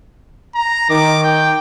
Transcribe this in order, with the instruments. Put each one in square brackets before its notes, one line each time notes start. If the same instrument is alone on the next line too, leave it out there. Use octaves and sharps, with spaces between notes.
[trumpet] A#5
[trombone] D#3 [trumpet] D6
[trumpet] G5